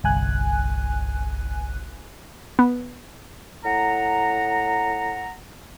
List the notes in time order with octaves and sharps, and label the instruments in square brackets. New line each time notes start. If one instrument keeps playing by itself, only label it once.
[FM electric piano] G1 C2 G#5 F#6
[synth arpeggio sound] B3
[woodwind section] A2 F#5 A#5